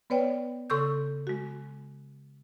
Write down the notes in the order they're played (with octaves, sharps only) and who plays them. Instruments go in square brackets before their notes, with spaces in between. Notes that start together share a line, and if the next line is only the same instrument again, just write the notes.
[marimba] B3 B4 C#5 D5 G5
C#3 A4 C6 C#6 E6 G6
G#3 F#4